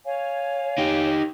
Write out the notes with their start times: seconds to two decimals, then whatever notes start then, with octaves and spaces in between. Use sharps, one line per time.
0.05 C#5 F5 G#5
0.78 D#4 G4